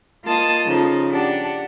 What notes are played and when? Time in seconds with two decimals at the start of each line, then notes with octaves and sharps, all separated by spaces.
0.24 A#3 F4 D#5 A5 D#6
0.65 C#3 F3 D#4 A4
1.12 D4 G4 F#5 A5